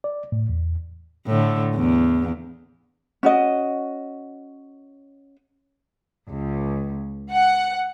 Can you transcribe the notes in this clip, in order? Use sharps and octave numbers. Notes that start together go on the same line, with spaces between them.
D5
A2
E2
A2 D3
E2
C#4 F#4 D#5
C#2
F#5